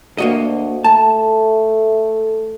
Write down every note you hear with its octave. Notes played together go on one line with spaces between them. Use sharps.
D2 A#3 F#4 D#5
A3 A5